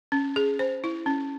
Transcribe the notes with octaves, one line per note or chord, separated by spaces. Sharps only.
C#4
G#4
C5
E4
C#4